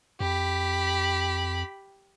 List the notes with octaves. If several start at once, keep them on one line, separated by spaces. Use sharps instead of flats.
F2 G4 B5